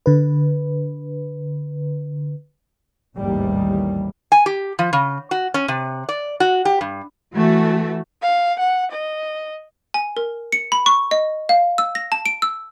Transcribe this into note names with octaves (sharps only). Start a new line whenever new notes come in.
D3 B4
A1 D#2 G#2 D#3 E3 G3
G#5
G4
F3
C#3
F#4
C#4
C3
D5
F#4
G4
G2
E3 A3 F#4
F5
F#5
D#5
G#5
A#4
C#7
B5
C#6
D#5
F5
E6
A#6
A5
D7
E6